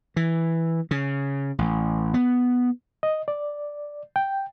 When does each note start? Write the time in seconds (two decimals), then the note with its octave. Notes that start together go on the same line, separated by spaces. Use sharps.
0.16 E3
0.91 C#3
1.59 A1
2.14 B3
3.03 D#5
3.28 D5
4.16 G5